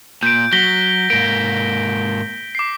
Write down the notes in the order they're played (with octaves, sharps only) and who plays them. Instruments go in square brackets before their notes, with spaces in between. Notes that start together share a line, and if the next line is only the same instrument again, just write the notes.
[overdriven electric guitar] A#2 [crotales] G6 D7
[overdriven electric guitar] F#3 [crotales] A#6 B6 G7
[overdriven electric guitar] G#2 A#3 [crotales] D7
[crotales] D6 C7